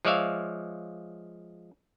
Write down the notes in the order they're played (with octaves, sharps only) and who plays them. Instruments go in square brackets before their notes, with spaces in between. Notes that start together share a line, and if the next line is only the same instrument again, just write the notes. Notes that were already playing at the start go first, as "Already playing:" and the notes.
[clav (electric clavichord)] F3 G#3 C#5 D5 E5 F5